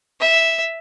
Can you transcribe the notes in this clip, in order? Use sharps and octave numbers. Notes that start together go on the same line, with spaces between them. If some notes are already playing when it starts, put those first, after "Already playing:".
E5